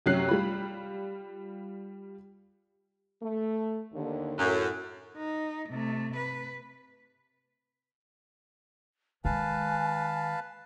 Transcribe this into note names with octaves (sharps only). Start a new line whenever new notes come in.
F#2 C3 F#3 C#4 F#6 C7
G3 F4 B5
A3
D#2 D3
F#2 A2
D#4
C3 A3
B4
D#3 G#3 B4 F5 G#5 A5